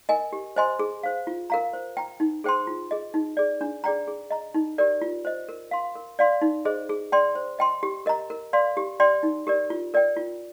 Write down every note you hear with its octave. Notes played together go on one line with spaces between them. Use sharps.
A#4 D#5 G#5
G4
C5 D#5 G#5 C6
G#4
C5 F5
F4
A#4 F5 A#5
C5
G5 A#5
D#4
G#4 C5 G5 C6
F4
G#4 D#5
D#4
G#4 D5
D4
G#4 D5 G5 A#5
G#4
D#5 A#5
D#4
G4 A#4 D5
F4
C5 D#5
A#4
F5 C6
A#4
D5 F5 C6
D#4
G#4 C5 D#5
G#4
D5 G5 C6
C5
D#5 G5 C6
G4
A#4 D#5 A#5
A#4
D5 F5 C6
G4
D5 G5 C6
D#4
G4 A#4 D5
F4
A#4 D5 G5
F4